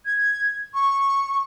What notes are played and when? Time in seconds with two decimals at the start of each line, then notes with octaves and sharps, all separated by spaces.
0.05 G#6
0.74 C#6